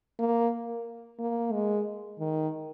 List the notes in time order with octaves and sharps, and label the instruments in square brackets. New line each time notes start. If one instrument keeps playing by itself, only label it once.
[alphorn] A#3
A#3
G#3
D#3